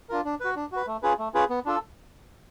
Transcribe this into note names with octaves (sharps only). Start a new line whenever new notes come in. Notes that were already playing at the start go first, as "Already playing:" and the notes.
D4 F4 A#4
D4
F#4 B4
D4
F#4 B4
A3
C#4 F4 G#4 B4
A3
C#4 F4 G#4 B4
B3
D4 F4 A4